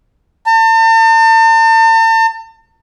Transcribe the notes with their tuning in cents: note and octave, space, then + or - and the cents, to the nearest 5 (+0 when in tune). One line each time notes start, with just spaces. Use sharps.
A5 +40